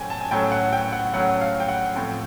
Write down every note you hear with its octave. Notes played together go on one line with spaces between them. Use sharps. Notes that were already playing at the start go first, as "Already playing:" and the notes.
Already playing: A2 F#3 A3 C#4 G5 G#5
A5
G#5
A2 F#3 A3 C#4 G5
F#5
G5
F#5
A2 F#3 A3 C#4 F#5
F5
G5
F#5
A2 F3 A3 C4 G5